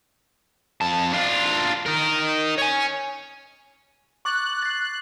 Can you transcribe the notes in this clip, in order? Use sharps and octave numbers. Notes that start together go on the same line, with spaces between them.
F2 A5
D4 F4
D#4 A#4
C#5 G#5
C#6 D6 F#6 A6
A6 C7